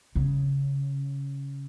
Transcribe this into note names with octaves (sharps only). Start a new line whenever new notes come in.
C#3